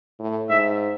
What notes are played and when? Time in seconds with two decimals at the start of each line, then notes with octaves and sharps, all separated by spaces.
0.20 A2
0.49 G#2 E5